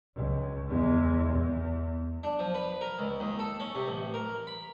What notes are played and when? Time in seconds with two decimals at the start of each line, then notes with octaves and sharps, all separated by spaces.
0.16 C#2
0.69 E2 G#3
1.32 E2
2.23 D4
2.39 F3
2.54 B4
2.81 A#4
2.99 C#2
3.20 D#2
3.39 A4
3.60 C#4
3.75 C3
3.87 A1
4.14 A#4
4.47 B5